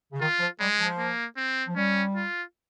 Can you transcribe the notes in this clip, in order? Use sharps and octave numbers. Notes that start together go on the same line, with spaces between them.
C#3
D#3 F4
F3
G3 G#3
F3
A#3
C4
F3
G3 C#4
F4